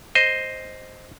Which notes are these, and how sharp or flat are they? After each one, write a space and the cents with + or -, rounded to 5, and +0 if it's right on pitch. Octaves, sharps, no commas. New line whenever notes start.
C5 +0 D#5 +0